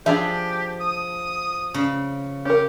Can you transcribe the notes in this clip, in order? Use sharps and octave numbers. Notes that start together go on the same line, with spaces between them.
F3 D4 G4 G#4 E5
D#6
C#3
C#4 G4 A#4